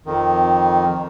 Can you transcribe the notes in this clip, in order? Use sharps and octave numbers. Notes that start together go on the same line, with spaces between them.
F2 D#3